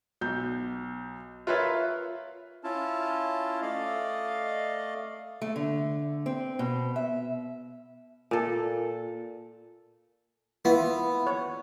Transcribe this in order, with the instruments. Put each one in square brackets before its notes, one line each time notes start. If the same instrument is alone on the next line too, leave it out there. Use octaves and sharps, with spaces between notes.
[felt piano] B1 G6
F4 A#4 B4 C#5 E5 F5
[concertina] C#4 E4 F4 A5
A3 D5 D#5 F5
[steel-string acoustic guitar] A3
D3
C4
B2
E5
[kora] A#2 A4
[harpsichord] B3 [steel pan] E4 F4
[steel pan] C#5